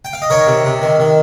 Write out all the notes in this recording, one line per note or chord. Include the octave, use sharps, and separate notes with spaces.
G5
F5
D#5
D#3 A#4 C#5
C3
C3
D#3
D#3